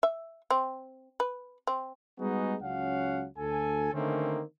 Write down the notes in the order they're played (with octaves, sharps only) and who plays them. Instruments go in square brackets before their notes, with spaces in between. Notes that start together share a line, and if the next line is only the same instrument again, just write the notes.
[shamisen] E5
C4
B4
C4
[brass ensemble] G3 G#3 B3 D#4 F#4 G#4
C#2 F#3 C#4 F5 F#5
D2 A4 G#5
D3 D#3 A3 A#3 C4 C#4